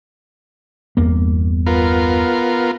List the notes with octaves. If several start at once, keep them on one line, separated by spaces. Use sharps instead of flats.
G1 E2 A#3
B3 F4 A#4